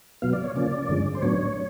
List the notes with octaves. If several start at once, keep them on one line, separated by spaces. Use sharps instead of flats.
B2 F#3 B3 F5
D5
C#5
C#3 F3 A#3 C#4 D5
G2 D3 F3 G#3 C#4
C5
A2 F#3 B3 D4 C#5